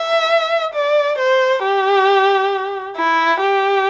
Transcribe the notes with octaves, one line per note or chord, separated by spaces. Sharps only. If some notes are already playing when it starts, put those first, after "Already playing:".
Already playing: E5
D5
C5
G4
E4
G4